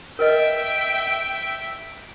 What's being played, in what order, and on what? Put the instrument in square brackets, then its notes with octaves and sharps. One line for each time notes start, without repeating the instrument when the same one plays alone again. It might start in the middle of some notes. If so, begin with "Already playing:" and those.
[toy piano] A#4 B4 D#5 [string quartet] E5 G5